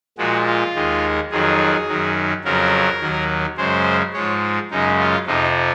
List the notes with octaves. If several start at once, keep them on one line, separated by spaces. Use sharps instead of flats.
A#2 F3 G#3 F#4
F4
D#2 D#3 G#3
F2 D#3 F#3 G#4
F#2 D#3 F#3
F2 C#3 F#3 A#4
D#2 D#3 F#3
F#2 C#3 G#3 C5
G#2 F3 G#3 C#5
F#2 C#3 G#3 D#4
F4
F2 C3 F3 D#4